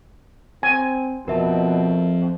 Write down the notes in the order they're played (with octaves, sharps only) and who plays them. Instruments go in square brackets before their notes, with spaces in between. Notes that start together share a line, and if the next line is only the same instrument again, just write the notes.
[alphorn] C4 [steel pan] G#5
[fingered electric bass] F2 [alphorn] B2 [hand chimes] A#4 E5 A5